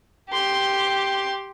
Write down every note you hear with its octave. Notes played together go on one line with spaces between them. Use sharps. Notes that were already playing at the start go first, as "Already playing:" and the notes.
G4 C6